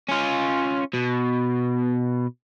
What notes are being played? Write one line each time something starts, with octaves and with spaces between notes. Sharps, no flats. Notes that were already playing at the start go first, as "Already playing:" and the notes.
C#4 F4
B2